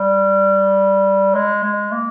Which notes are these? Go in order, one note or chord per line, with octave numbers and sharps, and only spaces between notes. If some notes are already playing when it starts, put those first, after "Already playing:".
Already playing: G3
G#3
G#3
A#3